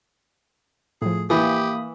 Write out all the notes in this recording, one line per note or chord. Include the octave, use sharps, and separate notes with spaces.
A2 F3 G#4
E3 A#3 G4 B5 D#6